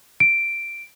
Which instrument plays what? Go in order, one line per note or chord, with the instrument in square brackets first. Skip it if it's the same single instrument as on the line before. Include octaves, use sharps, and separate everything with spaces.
[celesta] D7